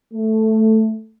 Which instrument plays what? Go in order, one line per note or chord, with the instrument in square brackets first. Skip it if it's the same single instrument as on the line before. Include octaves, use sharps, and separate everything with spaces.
[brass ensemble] A3